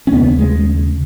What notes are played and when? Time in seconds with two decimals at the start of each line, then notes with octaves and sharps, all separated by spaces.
0.07 C#4
0.13 D#2 C#3 B3
0.39 G#3